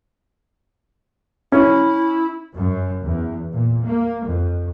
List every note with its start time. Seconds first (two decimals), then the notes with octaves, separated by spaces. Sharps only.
1.52 C#4 E4
2.56 F#2
3.04 E2
3.53 A#2
3.85 A#3
4.26 F2